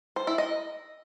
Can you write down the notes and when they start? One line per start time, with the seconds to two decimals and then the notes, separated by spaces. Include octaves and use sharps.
0.16 C5
0.27 E4
0.38 D#5